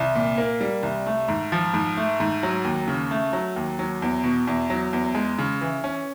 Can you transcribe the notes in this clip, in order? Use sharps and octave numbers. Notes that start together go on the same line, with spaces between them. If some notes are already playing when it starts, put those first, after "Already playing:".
Already playing: C2
A#2
A#3
G3
C2
A3
G#2
F3
G#2
A3
G#2
F#3
D#2
C#3
A3
F#3
D#2
F#3
E2
B2
E2
F#3
E2
G#3
C#3
E3
C#4